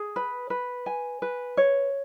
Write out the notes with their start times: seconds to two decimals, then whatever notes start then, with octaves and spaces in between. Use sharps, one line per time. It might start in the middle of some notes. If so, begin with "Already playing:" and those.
Already playing: G#4
0.16 B4
0.50 B4
0.86 G#5
1.22 B4
1.57 C#5